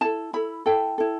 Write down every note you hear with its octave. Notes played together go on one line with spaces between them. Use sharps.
E4 A4 A5
E4 A4 B5
E4 A4 G5
E4 A4